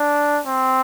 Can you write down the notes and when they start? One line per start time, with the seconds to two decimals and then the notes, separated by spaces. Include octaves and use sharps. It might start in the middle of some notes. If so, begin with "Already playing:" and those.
Already playing: D4
0.46 C4